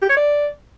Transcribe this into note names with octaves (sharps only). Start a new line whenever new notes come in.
G4
C#5
D5